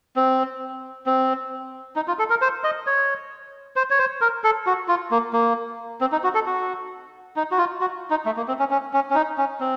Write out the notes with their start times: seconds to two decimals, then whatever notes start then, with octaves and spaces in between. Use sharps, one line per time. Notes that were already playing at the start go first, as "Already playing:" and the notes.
0.16 C4
1.06 C4
1.96 D#4
2.08 F4
2.19 A4
2.30 A#4
2.42 C5
2.64 D#5
2.87 C#5
3.76 C5
3.90 C#5
3.99 C5
4.21 A#4
4.44 A4
4.66 F#4
4.88 F4
5.11 A#3
5.33 A#3
6.01 C4
6.12 D#4
6.24 F#4
6.35 A4
6.46 F#4
7.36 D#4
7.51 F#4
7.58 F4
7.81 F#4
8.10 D#4
8.26 A3
8.37 A#3
8.48 C4
8.59 C#4
8.71 C#4
8.93 C#4
9.11 C#4
9.15 D#4
9.38 C#4
9.60 C4